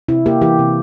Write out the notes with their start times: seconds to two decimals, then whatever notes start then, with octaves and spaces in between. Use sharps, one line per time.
0.08 C3 E4
0.26 A#3 G4
0.41 E3 G4
0.59 C3